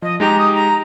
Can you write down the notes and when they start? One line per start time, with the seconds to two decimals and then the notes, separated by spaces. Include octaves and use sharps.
0.02 F3 D#5
0.20 G#3 D#4 G4 A#5
0.38 D#6
0.54 A#5